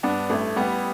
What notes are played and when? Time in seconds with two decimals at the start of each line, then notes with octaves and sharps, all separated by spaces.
0.03 G2 B3 D4
0.30 A1 A3
0.56 A1 G3 B3